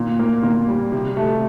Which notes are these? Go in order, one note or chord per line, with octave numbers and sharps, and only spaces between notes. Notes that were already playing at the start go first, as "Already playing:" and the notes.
Already playing: A#2
A#3
A#2
G3
C3
A3